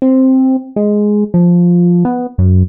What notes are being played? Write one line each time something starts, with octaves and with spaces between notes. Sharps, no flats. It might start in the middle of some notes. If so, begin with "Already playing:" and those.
C4
G#3
F3
B3
F#2